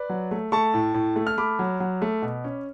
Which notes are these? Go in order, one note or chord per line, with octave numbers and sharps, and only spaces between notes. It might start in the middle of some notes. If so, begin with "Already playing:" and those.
Already playing: B4 D5
F#3
A3
A3 A5 C#6
A2
A2
A3
F6
A3 B5 D6
F#3
F#3
A3
B2
C#4